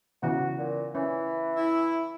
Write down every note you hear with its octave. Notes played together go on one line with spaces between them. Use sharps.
C#3 E3 B3 F#4
A#2
E3 C#4
E4